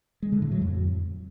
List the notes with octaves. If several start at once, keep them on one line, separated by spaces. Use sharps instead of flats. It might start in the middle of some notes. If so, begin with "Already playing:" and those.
G#3
D3
A2
F#3
F2